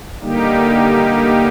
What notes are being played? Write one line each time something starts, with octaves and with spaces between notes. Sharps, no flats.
D3 G3 A#3 D#4 G4